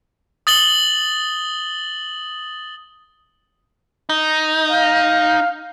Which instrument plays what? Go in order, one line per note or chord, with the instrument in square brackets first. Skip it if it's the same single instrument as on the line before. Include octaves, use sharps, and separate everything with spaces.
[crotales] D#6 A6 F#7 G7
[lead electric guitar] D#4
[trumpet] F5